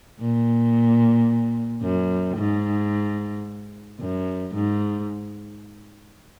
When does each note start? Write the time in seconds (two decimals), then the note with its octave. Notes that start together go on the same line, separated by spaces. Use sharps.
0.19 A#2
1.82 F#2
2.37 G#2
4.00 F#2
4.54 G#2